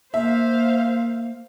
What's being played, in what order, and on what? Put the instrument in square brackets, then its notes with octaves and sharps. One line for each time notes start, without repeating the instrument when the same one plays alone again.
[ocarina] A#3 [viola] C5 F5 [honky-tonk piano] E5